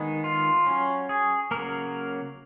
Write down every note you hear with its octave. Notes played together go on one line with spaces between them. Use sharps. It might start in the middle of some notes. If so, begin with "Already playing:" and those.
Already playing: D#3 G#3 B3 D#4
F4
F#3 C#4
G#4
C#3 F#3 A#3 A#4